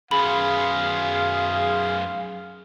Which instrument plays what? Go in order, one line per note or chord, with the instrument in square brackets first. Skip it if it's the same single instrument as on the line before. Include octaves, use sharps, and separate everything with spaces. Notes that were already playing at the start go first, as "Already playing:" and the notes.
[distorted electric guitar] F#2 B3 [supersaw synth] G#4 C6 F6 [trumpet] F5 [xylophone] B5